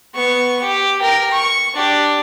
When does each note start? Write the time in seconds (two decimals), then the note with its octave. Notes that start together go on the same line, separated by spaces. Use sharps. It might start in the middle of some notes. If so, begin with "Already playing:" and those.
0.14 B3 C#6
0.62 G4
1.02 A#4 G5
1.32 C#6
1.75 D4 G4